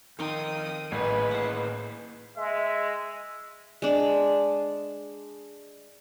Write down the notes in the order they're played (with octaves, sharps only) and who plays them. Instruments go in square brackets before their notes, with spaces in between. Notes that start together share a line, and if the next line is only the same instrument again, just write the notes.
[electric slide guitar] F2 G5 [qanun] D#3 D#4 C6 [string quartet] D#6
[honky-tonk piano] A1 [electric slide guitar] A#3 E4 G#4 [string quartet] B4
[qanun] C5 F#5
[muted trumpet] G#3 [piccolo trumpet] E5
[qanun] G#3 D4